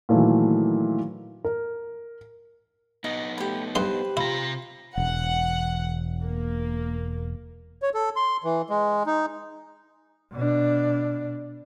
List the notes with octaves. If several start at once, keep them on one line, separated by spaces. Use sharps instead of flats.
A#2 D#3 E3 F#3 A3
A#4
B3 D#4 D#5
A3 G4 B5
G2 G4 B4 C5 C6
C3 E4 F4 A#5
E1 F#5
A#3
C#5
A4
C6
E3
G#3
D#4
B2 D4